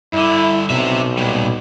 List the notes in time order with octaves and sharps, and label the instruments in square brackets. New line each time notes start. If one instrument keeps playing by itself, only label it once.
[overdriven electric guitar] G2 D3 [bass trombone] E4
[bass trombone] B1 [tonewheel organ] B2 [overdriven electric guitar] C4 E5
[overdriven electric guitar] A#2 G3